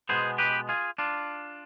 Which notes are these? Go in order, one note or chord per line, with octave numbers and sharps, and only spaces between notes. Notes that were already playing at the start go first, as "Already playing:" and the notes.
B2 G#3 B3 G#4 C5
G4 B4
F4 G#4
D4 F4